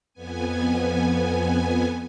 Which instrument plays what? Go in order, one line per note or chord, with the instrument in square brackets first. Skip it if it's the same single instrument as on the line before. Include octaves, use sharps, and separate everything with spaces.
[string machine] F2 B3 G#5